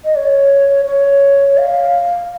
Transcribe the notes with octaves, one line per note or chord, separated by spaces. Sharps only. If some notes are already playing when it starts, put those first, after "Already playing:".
D#5
C#5
C#5
F5